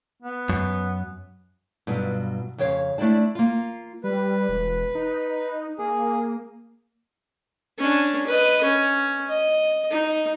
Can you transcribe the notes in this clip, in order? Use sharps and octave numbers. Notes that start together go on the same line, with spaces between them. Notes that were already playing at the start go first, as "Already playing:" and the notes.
B3
F#2
G2 B2 F#3 F4
F2 C#3 C#5 F5
A3 D4 E4 D5 A5
A#3 F4
G3 B4
E1
D#4
A#3 G#4
C#4 D4
B4 D#5
C#4
D#5
D#4